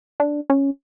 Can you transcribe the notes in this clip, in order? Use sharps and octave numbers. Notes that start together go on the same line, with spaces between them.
D4
C#4